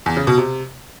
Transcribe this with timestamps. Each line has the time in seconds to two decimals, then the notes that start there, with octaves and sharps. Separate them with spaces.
0.06 E2
0.17 C#3
0.27 B2
0.38 C3